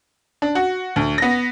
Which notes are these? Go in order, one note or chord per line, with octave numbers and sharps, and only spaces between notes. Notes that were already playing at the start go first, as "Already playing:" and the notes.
D4
F#4
D2
B3 A#6